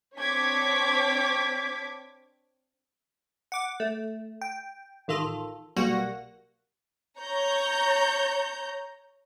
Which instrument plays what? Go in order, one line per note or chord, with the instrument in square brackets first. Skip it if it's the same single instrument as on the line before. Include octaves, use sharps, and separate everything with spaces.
[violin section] C4 D4 C#5 D6 G#6 B6
[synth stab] F#5 D6
A3
G5
A1 D#3 F4 A4
B1 G3 A#3 F#4 F#5 A#6
[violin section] C#5 A#5 G6